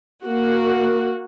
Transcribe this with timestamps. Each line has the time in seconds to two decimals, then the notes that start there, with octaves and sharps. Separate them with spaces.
0.23 A#3 F#4